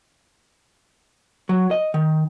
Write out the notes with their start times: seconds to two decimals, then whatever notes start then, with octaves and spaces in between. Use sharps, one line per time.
1.49 F#3
1.71 D#5
1.94 D#3